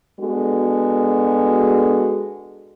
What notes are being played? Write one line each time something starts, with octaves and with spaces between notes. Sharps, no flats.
G#3 B3 D4 F#4 A4